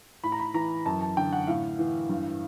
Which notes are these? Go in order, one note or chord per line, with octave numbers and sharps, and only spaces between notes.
A2 B5
A#5
B5
E3 A#5
F#2 A5
A5
D3 G5
F#5
A2 F5
E3
G2